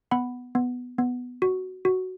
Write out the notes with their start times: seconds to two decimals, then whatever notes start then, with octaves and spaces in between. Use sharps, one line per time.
0.11 B3 F#5 B5
0.55 B3
0.98 B3
1.42 F#4
1.85 F#4